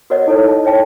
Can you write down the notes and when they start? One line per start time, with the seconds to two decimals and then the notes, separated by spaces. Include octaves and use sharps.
0.10 F#4 A#4 C#5 D#5 F#5
0.27 D#4 E4 A4 C#5
0.47 D#5 A5
0.65 C#5 E5 G5 A5